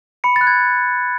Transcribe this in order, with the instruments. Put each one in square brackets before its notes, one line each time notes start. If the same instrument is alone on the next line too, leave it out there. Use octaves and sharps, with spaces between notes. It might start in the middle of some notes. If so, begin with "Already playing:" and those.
[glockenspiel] B5 C#7
A6
F#6
G#6